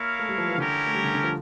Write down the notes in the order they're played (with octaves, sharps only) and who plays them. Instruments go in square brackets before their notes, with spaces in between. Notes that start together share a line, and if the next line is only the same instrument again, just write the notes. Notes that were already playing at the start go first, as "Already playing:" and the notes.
Already playing: [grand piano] A#3 [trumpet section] E4 A#4 C#5 F5
[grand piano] A3
G3
F3
E3
[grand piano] D3 [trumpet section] C#4 E4 G4 A#4
[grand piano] A3
G3
D3
D3
F3